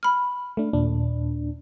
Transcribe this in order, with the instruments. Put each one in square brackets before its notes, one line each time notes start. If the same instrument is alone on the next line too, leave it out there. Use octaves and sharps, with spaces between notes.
[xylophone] B5 F6
[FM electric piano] A3 D4
D#2 A#2 D4